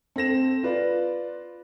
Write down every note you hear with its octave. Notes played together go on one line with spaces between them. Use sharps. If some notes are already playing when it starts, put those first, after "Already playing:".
C4 A4 A#6 E7
F4 B4 D5